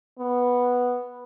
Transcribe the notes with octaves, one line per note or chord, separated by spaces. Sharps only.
B3